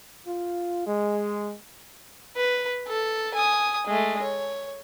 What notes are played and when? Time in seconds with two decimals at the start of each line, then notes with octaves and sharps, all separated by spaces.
0.26 F4
0.86 G#3
2.36 B4
2.87 A4
3.35 G#5 D#6
3.87 G#3 A3
4.23 C#5